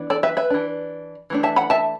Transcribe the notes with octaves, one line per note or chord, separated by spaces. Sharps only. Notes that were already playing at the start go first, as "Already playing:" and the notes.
Already playing: E3 B3 D4
A4 D5
B4 E5
B4 E5
E3 D4
E3 A3 D4
E5 A5
F#5 B5
E5 A5